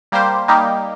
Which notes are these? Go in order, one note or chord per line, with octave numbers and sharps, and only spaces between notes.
G3 A#3 G4 C5
G3 A#3 D#4 G4